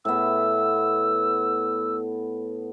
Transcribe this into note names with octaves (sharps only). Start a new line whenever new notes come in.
A2 B3 E6